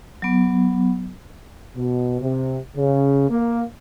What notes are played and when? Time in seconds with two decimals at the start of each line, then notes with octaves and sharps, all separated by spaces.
0.22 F#3 B3
1.76 B2
2.21 C3
2.75 C#3
3.29 A#3